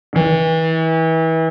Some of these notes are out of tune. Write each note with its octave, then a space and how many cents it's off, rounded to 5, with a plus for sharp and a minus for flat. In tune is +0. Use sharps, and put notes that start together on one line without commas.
E3 -30